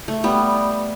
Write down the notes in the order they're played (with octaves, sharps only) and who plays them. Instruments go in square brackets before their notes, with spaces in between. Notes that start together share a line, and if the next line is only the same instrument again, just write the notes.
[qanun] A3
G3 B3